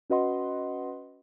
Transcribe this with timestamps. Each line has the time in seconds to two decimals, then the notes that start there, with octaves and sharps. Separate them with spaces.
0.10 C#4 F#4 B4 D#5 F#5 C6